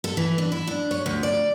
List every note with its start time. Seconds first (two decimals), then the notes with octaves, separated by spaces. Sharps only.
0.04 A4
0.17 E3
0.38 D4
0.52 E4
0.67 D4
0.91 C#5
1.06 D2
1.23 D5